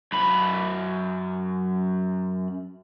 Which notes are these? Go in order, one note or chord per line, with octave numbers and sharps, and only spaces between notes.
F#2 B5